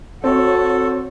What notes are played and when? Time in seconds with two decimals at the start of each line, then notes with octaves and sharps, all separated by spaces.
0.24 C4 F#4 A4 C#5